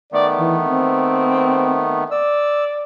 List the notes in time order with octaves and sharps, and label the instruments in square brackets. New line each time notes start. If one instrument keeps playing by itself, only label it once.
[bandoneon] D#3 A3 B3 [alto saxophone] D5
[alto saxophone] E3
C4
[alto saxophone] D5 [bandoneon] E6